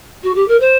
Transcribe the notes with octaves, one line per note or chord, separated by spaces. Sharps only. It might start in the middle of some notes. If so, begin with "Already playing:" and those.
F#4
G4
A#4
C5